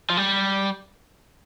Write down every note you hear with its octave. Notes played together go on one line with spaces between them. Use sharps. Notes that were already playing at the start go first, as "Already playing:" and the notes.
F3
G3